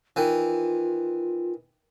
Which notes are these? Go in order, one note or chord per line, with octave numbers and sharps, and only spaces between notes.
D#3 E3 F4